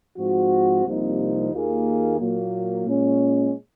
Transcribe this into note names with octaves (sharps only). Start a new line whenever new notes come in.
G#2 F3 C4 F#4
C2 C3 F3 A#3 D#4
D#2 D#3 A#3 F4 G#4
A#2 F#3 A#3
A#2 G#3 C#4